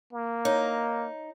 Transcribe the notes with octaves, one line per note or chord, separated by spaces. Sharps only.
A#3
D#4 C#5